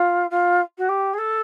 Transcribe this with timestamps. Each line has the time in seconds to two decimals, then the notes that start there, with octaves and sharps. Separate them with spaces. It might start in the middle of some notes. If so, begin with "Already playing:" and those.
Already playing: F4
0.30 F4
0.78 F#4
0.89 G4
1.13 G#4
1.18 A4